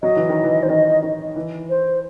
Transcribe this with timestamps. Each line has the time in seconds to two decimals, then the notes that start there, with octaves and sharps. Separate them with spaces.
0.02 F#3 D#5
0.16 E3
0.29 D#3
0.43 E3
0.63 E3 C5
0.69 D#3 D#5
1.03 D#3
1.36 E3
1.69 C5